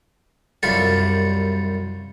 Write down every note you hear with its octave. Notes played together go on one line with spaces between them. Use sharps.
C2 F#2 G3 F4 A4 E5